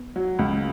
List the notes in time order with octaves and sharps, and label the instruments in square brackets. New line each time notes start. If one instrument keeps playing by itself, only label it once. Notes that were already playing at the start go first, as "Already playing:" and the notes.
Already playing: [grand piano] B3
[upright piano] F#3
C#2